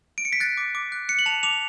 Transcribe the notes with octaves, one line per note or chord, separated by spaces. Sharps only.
D7
C#7
B6
F#6 A6
D6
D6
F#6
F#6 C#7
F#7
A5 F7
D6 F7